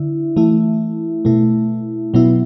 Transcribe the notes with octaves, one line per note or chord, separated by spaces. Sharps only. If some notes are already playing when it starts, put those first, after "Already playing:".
Already playing: D3 E4
E3 A3 E4
B2 A3 E4
B2 F#3 B3 E4